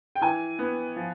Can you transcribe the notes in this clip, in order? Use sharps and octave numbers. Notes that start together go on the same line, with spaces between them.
G5
E3 G#5
B3
F3